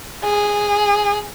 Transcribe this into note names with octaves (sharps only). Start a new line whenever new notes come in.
G#4